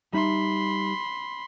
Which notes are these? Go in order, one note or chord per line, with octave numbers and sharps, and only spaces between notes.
G3 D#4 E5 B5 C6